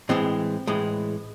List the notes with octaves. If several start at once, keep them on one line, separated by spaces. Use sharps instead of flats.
A2 E3 G#3 C4
A2 E3 G#3